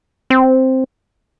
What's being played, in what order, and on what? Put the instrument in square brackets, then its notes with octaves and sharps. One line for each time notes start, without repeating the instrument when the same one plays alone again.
[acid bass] C4